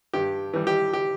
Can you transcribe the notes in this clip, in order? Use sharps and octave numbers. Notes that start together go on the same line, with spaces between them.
G2 G4
E3 G3
G4
G4